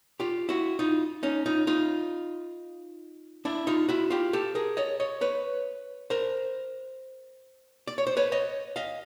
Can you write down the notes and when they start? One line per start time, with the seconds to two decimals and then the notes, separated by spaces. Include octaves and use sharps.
0.20 F4 G4
0.49 E4 F#4
0.79 D#4 F4
1.23 C#4 D#4
1.46 D#4 F4
1.67 D#4 F4
3.45 D4 E4
3.67 D#4 F4
3.89 E4 F#4
4.10 F4 G4
4.33 G4 A4
4.55 G#4 A#4
4.77 C#5 D#5
5.00 C#5 D#5
5.21 B4 C#5
6.10 A#4 C5
7.87 D5
7.98 C#5
8.07 C5
8.17 B4 C#5
8.32 C#5 D#5
8.76 D#5 F5